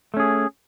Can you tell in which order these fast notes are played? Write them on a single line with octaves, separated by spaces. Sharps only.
A3 C#4 G#4